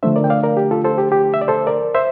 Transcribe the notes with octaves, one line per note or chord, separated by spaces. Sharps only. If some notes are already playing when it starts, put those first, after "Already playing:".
D3 F3 A3 D4 C5 E5
A#4 D5
G5
D5 F5
A#4 D5
G4
F4 A4
A4 C5
G4
G4
E5
D5
A4 C5
A#4 D5
C5 E5